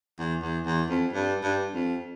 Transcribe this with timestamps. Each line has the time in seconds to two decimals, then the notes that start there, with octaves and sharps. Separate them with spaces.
0.19 E2
0.42 E2
0.66 E2
0.89 F2
1.13 G2
1.43 G2
1.74 F2